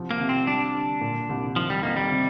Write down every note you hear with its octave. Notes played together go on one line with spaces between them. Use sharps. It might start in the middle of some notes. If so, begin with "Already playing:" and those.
Already playing: C2 F3
A#3
C3
C4
G3 D4
D3
A#2
C2
D#3 F3
G3
F2 A#3
G3
C3